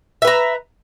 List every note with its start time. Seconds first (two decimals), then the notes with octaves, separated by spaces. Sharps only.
0.22 E5
0.25 B4
0.27 A#5